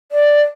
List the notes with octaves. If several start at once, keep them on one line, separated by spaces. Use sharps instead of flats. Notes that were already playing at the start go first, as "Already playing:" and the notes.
D5